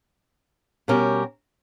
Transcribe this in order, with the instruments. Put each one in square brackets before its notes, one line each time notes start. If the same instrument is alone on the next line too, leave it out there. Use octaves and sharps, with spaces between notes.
[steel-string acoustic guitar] B2 G3 C#4 G4 A#4